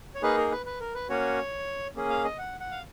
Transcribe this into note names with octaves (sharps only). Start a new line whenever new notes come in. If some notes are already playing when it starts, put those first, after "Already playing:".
C#5
A#3 D#4 G#4 B4
A#4
B4
B4
A#4
B4
A#3 C#4 F#4 C#5
A#3 C#4 G#4
F5
D#5
F#5
F#5
F5